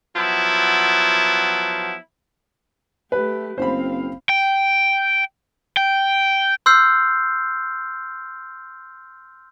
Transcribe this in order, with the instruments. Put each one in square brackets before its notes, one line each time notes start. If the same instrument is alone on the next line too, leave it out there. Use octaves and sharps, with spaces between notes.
[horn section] F3 F#3 B3 E4
[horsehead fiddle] A3 G4 [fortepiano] B4
[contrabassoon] F#1 [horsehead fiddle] C4 F5 [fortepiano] C5 B5
[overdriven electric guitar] G5
G5
[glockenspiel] C6 E6 F6 G6 C7